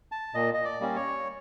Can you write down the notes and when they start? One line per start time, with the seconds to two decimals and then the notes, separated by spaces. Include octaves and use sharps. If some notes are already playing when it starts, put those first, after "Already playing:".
0.12 A5
0.34 A#2 D#5
0.54 D#5
0.65 D5
0.81 G3 A#3 C#4
0.96 C#5